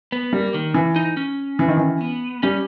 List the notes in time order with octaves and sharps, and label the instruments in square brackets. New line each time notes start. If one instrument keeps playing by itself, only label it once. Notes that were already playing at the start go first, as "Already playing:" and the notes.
[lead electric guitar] B3
[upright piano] G3 [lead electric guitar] A#3
[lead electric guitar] D#3
[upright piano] E3
[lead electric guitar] D#4
C#4
[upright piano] E3
D#3
E3
[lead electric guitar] B3
[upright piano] G3 [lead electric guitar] C#4